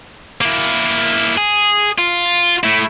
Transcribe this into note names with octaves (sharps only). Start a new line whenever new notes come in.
A#3 E4
G#4
F4
A3 E4